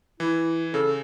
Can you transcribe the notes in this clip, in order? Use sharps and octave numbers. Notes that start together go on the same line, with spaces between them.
E3 E4
C#3 A4